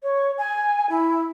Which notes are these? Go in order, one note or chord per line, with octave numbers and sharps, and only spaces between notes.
C#5
G#5
E4